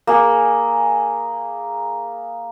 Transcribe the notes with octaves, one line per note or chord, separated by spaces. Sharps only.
A#3 G#4